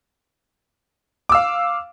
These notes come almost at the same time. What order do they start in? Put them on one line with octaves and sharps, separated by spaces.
D6 E6 F5